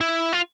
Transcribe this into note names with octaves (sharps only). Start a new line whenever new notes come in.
E4
F4